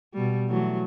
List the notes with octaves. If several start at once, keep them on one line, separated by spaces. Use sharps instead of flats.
B2 G3
E3 F#3 A3